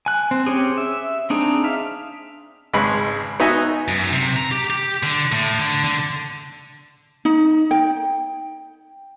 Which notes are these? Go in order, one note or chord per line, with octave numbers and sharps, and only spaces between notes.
G#5 F#6
C4
C4 C#4 G4 G#4
E5
C4 D4 D#4 G#4
E5 F5
G#1 C#3 G#3 B4 B5
B3 D#4 F#4 D#5 E5 G#5
F#2
C3
A#5
G4
G4
D3
A2
D3
D3
D#4
G5